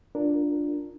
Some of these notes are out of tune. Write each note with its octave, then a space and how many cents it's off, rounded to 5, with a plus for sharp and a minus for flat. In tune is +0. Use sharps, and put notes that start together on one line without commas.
D4 +0 F4 +5 A#4 +0